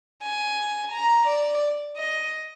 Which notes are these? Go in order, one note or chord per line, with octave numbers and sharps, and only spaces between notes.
G#5
A#5
D5
D#5